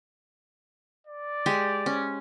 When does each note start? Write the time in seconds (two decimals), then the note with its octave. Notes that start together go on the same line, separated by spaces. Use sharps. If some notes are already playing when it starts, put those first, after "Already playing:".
1.07 D5
1.46 G#3 G4
1.86 C#4